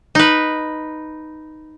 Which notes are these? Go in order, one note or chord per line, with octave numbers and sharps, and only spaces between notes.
D#4 B4